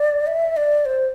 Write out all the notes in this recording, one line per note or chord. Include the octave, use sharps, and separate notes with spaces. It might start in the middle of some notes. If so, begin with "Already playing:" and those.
Already playing: D5
E5
D5
C5